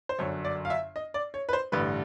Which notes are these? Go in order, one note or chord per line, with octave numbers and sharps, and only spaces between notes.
C5
G1 F#2 D3 C#5
D5
F5
E5
D#5
D5
C#5
B4
C5
A1 G2 D3 G3 B4